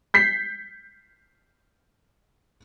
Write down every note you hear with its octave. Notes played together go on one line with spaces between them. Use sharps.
G6 B6 C7